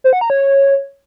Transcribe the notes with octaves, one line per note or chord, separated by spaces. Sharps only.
C5
F#5
A#5
C#5